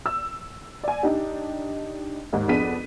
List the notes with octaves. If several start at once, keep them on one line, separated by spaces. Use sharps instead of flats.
E6
D5 G#5
D4 D#4 G4
D#2 G#2
F2 B3 D4 G#4 B6 D#7